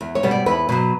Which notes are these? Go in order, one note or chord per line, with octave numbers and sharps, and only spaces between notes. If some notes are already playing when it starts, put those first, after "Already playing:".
E2
C#5
B2 G3 B3
D5
E2 B4
B2 F#3